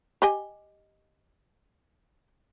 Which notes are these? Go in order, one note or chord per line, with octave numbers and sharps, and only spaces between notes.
G4 D#5 G#5